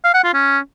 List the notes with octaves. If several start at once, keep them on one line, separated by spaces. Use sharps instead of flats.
F5
F#5
F4
C#4